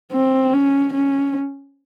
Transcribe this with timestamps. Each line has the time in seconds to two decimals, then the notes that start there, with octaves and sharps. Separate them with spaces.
0.12 C4
0.53 C#4
0.93 C#4